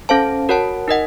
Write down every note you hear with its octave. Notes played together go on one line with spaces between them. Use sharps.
C#4 A4 C5 F5 A5
F#4 A#4 C#5 F#5 A5
D#4 A#4 D#5 F#5